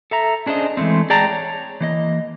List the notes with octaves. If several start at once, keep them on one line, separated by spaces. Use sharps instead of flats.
A4 E5 A#5
C#4 D4 G#4 C5 D#5
E3 G#3 A3 C4
G#4 D5 G5 A5 A#5
C#5
E3 A#3 D#5